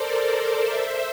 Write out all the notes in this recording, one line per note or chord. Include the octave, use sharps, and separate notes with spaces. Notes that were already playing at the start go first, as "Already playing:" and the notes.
Already playing: A4 A#4 C5 D5
C5 E5